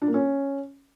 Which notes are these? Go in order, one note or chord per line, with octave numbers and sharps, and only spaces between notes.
D4
A#3
C#4